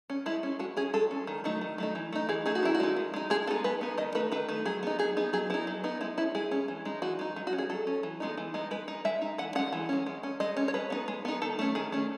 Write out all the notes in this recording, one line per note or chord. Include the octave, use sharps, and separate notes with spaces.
C#4
G#3 E4
C#4
G#3 F#4
C#4 G#4
G#3 A4
C#4
D#3
F#3 A3 D#4
D#3
F#3 A3 D#4
E3
A3 D#4
E3 G#4
A3 D#4 G#4
F#4
D#3 E4
F#4
G#3 D#4
D#3
G#3 D#4
G#3 G#4
B3 D#4 A4
G#3 B4
B3 D#4
D#3 D#5
A3 D#4 B4
D#3 B4
A3 D#4
F#3 G#4
B3 D#4
F#3 G#4
B3 D#4
F#3 G#4
B3 D#4 E4
F#3
B3 D#4
G#3 E4
C#4 E4
G#3 G#4
C#4
E3
G#3 D#4
E3 F#4
G#3 D#4
F#3 D#4
F#4
C#4
G#4
F#3 A4
C#4
E3
G#3 B3 D#4
E3
G#3 B3 D#4
G#3 B4
D#4
G#3 E5
D#4
E3 F#5
G#3 C#4 F#5
E3
G#3 C#4
G#3
C#4
G#3 D#5
C#4
C#5
G#3 B4
B3 D#4
G#3
B3 D#4
D#3 A4
A3 C#4
D#3 G#4
A3 C#4